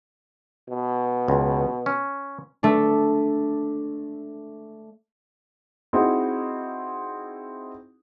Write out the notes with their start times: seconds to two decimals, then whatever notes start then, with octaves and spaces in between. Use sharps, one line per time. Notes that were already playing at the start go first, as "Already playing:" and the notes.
0.69 B2
1.28 C#2
1.86 C#4
2.63 A3 D4
5.93 C4 D#4 E4 F#4 G#4